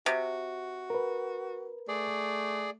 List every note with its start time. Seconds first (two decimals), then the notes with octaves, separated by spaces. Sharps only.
0.06 C3 F#4
0.90 A#4 B4
1.88 A3 G#4 D5